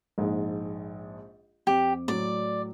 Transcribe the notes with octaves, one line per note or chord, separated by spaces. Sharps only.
A#1 G#2
F2 G4
A2 F#3 D5